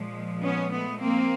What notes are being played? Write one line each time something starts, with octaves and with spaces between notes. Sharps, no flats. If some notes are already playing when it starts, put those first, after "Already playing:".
Already playing: A#2 F3 G#3
B3 C#4
A3 B3
A#3 C4